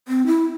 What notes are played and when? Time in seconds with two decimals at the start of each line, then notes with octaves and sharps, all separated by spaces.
0.08 C4
0.26 E4